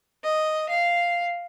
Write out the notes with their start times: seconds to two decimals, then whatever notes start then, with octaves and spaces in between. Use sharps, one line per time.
0.24 D#5
0.69 F5